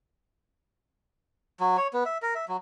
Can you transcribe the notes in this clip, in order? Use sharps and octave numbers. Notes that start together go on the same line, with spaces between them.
F#3
C#5
B3
E5
A#4
E5
F#3